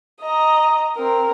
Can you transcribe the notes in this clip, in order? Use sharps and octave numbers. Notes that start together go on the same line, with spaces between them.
D#5 A#5
C4 A#4